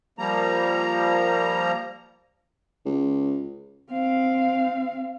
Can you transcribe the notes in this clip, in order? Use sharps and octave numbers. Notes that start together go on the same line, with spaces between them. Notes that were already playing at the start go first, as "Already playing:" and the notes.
F3 G3 A#3 A#5
C#2
C4 F5